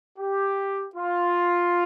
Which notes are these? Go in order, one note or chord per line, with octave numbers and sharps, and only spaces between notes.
G4
F4